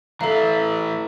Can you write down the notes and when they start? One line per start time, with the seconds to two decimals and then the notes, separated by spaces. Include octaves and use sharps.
0.21 E3 A3 A4 F5 A#5